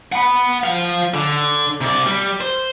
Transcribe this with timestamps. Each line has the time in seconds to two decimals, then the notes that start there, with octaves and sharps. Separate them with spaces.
0.12 F#5 B5
0.64 F3 F5
1.14 D3
1.81 C3 D5
2.06 G3
2.41 C5